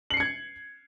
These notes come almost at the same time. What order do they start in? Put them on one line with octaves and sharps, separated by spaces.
F#7 C7 C#7 G#6